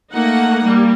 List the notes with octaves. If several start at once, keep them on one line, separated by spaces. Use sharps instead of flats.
A3 A#3 D#4 F#5
G3 A#3